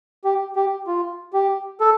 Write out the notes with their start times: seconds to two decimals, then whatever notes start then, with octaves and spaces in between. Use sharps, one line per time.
0.25 G4
0.56 G4
0.87 F4
1.33 G4
1.81 A4